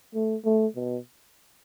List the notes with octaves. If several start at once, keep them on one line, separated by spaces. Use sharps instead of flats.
A3
A3
B2